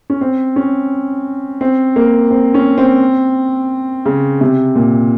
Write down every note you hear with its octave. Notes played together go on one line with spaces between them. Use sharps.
C#4
C4
C#4
C4
A#3
C4
C#4
C4
C#3
C3
A#2